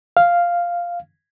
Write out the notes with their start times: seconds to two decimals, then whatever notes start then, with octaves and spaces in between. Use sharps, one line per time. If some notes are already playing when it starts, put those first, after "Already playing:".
0.17 F5